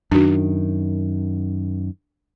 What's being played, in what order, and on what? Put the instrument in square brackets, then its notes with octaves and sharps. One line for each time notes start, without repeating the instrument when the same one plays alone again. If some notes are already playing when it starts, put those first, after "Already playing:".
[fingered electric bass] F#2 D#3 [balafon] D4 F#4